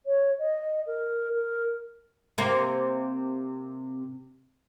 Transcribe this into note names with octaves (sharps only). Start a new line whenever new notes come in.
C#5
D#5
A#4
A#4
C3 A#3